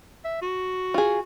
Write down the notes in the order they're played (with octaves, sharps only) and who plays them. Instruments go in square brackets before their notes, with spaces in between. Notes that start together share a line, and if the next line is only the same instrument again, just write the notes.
[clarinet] E5
F#4
[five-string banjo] F4 G#4